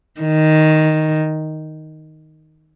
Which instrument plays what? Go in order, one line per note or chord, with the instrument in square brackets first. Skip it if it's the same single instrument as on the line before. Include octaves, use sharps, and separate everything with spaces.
[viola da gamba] D#3